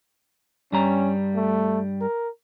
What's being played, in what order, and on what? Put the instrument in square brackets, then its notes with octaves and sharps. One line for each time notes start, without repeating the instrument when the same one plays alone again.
[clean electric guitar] G2 G3 A#5 [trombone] C#4
[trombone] A3
A#4